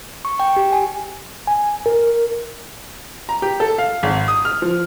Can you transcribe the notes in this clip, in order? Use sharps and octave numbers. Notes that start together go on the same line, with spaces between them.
C#6
G5
G4
G#5
G#5
A#4
A#5
G4
A4
F5
G#1
D#6
F6
F3